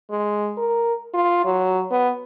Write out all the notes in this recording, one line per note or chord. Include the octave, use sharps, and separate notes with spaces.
G#3
A#4
F4
F#3
B3